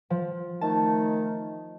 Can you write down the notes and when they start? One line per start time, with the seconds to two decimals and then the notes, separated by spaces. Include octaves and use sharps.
0.10 F3
0.61 D#3 A3 A5